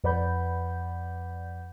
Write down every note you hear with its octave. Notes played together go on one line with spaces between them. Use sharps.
F2 B4 D5 F#5 B5 G6